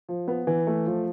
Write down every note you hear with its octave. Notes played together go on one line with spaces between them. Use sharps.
F3
B3
E3
A3
F3